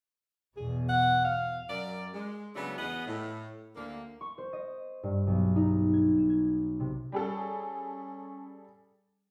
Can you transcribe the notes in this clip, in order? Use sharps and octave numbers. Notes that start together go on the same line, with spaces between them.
E2 B2 G#4
F#5
F5
F#2 A#4 D5
G#3
C#3 F#3 A3 B3 D4
E2 B3 G#4 D#5 F#5
A2
D2 D3 A#3
C#6
C5
D#5
G2
B1
D#4
G#6
E7
G#6
C3
G3 C#4 G#4 A4